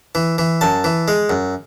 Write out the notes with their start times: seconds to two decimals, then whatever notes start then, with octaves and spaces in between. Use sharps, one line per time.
0.15 E3
0.38 E3
0.61 F#2 A5
0.84 E3
1.08 G#3
1.30 F#2